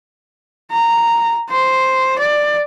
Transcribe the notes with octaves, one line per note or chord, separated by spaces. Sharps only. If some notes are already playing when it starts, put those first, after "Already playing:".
A#5
C5
D5